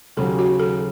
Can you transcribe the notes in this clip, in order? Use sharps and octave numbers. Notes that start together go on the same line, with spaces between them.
D#2 C#3 F#3 A4
F#4
A4